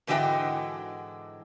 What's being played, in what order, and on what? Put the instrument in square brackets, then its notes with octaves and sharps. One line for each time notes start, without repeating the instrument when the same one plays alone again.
[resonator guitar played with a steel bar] G#2 D3 E3 F#4 D#5 G5